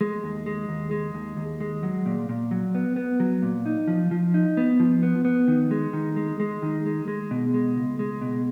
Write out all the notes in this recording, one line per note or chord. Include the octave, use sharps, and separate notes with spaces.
G#3
D#2
G#3
D#2
G#3
D#2
D#2
G#3
F#3
A#2
A#2
F#3
B3
B3
F#3
A#2
D#4
F3
F3
D#4
B3
F3
B3
B3
D#3
G#3
D#3
G#3
G#3
D#3
G#3
G#3
B2
G#3
C#2
G#3
B2